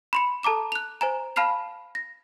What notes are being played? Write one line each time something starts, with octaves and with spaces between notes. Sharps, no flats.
B5 C6 C#7
A4 A5 A#5 D6 E7
F#6 F7
C5 G#5 A#5
F5 A5 B5 F6 C7 F7
A#6